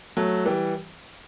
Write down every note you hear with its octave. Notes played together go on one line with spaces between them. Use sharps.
F#3 A3
E3 G3